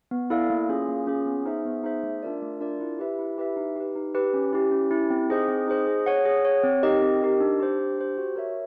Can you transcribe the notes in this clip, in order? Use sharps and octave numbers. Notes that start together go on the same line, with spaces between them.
B3
E4 A4 D5 F5
A#3
C#4 F4 G#4
A#3
C#4 F4 G#4
B3
D#4 G#4 C5 E5
B3
D#4 G#4 C5 E5
A3
D4 F4 A#4 D5
A3
D4 F4 A#4 D5
E4
G4 B4 E5
E4
G4 B4 E5
D#4
G4 B4
D#4
G4 B4
C#4
E4 G4
C#4
E4 G4
C4
D#4 G#4 C5 D#5
C4
D#4 G#4 C5 D#5
G#4
C#5 F#5
G#4
C#5 F#5
C4
D#4 G4 A#4 D#5
C4
D#4 G4 A#4 D#5
D4
G4 C5
D4
G4 C5
F#4
A#4 C#5 E5